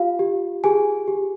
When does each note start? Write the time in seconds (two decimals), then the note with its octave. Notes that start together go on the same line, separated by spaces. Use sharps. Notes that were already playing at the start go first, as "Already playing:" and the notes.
Already playing: F4 G4 F5
0.19 G4
0.64 G4 G#4 G#5
1.07 G4